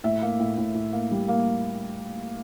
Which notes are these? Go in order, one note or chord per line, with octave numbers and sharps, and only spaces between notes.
A2 E5
A#3
A2
A2
A2
A#3
G3
A#3